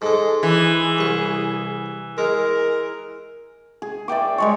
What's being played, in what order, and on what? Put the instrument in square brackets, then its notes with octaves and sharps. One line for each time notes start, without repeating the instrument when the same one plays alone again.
[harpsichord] G#2 G#3 [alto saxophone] A4
[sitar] E3 [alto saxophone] G#4
[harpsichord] C2 C#6
[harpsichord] G#3 [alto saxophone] A#4
[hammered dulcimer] G#4
D5 E5 G5 D6
G3 G#3 C#5